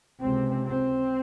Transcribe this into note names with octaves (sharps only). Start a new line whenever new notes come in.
C#2 C3 C4
C4